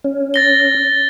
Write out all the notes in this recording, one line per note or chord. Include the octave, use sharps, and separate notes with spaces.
C#4
A6 A#6 G7